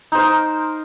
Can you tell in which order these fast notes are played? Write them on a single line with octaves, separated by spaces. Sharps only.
D#4 C5 A#4